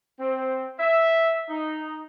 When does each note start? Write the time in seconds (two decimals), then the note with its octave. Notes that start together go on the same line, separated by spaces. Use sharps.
0.20 C4
0.78 E5
1.50 D#4